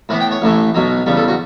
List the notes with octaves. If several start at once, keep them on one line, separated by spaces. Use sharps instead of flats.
A2 E3 B3 B4
G5
C#5
A1 A2 E3 A3
B1 B2 F#3
E2 C#3 G3
A4
F#4